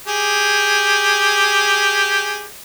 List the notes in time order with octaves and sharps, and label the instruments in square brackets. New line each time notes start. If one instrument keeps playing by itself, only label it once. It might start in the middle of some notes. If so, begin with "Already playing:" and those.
[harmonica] G4 G#4